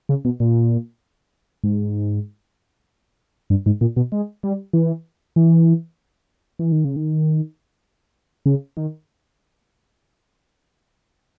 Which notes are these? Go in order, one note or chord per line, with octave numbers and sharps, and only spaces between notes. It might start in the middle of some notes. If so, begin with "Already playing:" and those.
C#3
B2
A#2
G#2
G2
G#2
A#2
B2
G#3
G3
E3
E3
E3
D#3
C#3
D#3
C#3
D#3